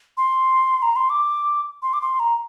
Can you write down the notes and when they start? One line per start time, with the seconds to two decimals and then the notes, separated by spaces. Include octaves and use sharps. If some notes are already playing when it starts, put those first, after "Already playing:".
0.17 C6
0.82 A#5
0.96 C6
1.10 D6
1.83 C6
1.93 D6
2.01 C6
2.20 A#5